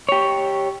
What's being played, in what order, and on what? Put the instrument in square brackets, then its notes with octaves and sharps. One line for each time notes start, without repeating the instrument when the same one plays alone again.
[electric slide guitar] G4 C#5